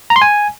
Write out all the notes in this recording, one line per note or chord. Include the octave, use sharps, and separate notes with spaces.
A#5
C6
G#5